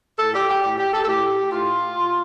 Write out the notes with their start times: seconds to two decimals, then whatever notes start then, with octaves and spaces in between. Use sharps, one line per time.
0.19 A2 A4
0.34 G4
0.49 G4
0.63 A2 G4
0.78 G4
0.93 A4
1.04 A4
1.07 A2 G4
1.51 A2 F4
1.96 A#2